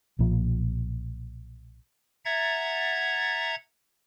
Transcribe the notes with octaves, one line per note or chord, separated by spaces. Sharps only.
B1 A#2 F3
E5 F#5 A#5 G#6 A6